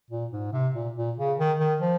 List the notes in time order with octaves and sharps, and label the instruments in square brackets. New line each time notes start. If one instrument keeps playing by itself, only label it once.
[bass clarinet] A#2
G#2
C3
A#2
A#2
C#3
D#3
D#3
F3